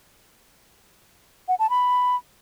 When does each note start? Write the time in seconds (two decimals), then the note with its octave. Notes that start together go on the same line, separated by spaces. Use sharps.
1.48 F#5
1.59 A5
1.70 B5